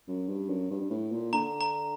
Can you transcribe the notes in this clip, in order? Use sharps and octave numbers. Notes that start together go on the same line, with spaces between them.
F#2
G2
F#2
G2
G2
A2
A#2
D3 A#5
A#5